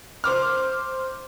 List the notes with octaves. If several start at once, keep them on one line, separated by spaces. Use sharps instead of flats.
C5 D6 F6